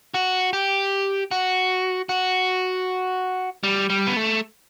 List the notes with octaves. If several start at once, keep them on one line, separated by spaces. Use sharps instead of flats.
F#4
G4
F#4
F#4
G3
G3
B3
A3